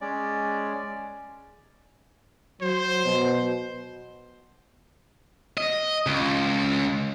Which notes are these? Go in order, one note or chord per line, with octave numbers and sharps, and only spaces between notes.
G#3 C#4 D5
F#3 C5
B2
D#5
C#2